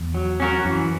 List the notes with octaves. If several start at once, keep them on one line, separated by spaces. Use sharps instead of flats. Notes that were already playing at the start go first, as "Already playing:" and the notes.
Already playing: E2
F#3
C#4 F#4 A#4
F#2 E3